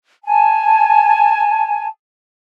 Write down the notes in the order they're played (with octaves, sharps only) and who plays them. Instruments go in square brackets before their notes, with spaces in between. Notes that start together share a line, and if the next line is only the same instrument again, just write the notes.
[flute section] G#5 A5